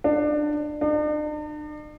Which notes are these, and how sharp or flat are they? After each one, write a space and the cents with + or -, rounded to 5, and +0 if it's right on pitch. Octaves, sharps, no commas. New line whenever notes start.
D4 +25
D4 +45